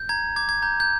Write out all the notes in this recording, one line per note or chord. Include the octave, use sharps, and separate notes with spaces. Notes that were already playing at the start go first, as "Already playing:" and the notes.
Already playing: G6
A#5 G#6
D6 G#6
G#6
A#5 G6
G6